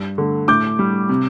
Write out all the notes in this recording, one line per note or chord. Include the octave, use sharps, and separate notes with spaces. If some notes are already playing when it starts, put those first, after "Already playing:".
Already playing: G2
D3 A3
A2 D6 G6
G3
C3